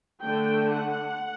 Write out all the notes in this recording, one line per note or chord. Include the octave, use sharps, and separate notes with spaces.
D3 A3 D4 G5
F#5